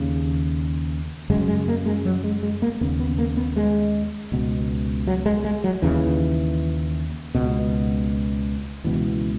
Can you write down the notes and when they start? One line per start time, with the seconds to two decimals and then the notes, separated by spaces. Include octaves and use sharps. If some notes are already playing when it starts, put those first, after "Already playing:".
Already playing: D#2 C#3
1.30 F#2 C#3 G#3
1.48 G#3
1.68 A#3
1.86 G#3
2.05 F#3
2.24 G#3
2.43 G#3
2.62 A#3
2.81 D#2 C#3 B3
2.99 B3
3.18 A#3
3.37 B3
3.56 G#3
4.32 C#2 B2
5.07 F#3
5.26 G#3
5.45 G#3
5.64 F#3
5.82 D#2 C#3 E3
7.35 C#2 B2
8.84 C#2 B2 E3